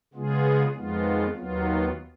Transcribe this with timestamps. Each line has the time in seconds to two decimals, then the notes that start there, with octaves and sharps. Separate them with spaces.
0.14 C#3 G#3 B3 F4 G#4
0.75 F2 D#3 G#3 B3 F4
1.36 D#2 D#3 F#3 B3 F4